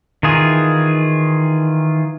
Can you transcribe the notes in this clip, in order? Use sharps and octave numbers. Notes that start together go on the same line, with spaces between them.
D#3 E3 F4 G#4